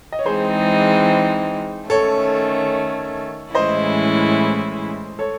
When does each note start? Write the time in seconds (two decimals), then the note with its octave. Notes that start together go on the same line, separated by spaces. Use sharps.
0.12 D#5
0.19 C#5
0.26 E3 G#3 C4 D#4 G#4 C5
1.90 D#3 A3 C#4 A4 C#5
3.54 A2 E3 G#3 C#4 E4 C5 D#5
5.19 A4 C#5